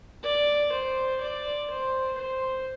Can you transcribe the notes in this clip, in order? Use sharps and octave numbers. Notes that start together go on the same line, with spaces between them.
D5
C5
D5
C5
C5